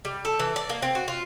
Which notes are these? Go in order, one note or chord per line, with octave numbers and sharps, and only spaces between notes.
G3
A4
E3
D5
A#3
C4
F#4
F4